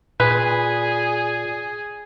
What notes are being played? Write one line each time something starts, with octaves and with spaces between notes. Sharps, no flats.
A#2 G#4 B4